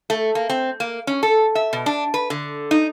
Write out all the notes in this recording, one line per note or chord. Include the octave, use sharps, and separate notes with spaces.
A3
A#3
C4
A#3
C#4
A4
E5
B2
D4
B4
D3
D#4